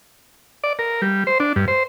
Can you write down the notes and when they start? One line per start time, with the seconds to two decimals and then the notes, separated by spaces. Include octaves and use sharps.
0.64 D5
0.79 A#4
1.02 G3
1.27 C5
1.40 D4
1.56 G2
1.68 C5